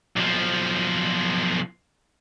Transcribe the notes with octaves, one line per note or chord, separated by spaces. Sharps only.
B1 F3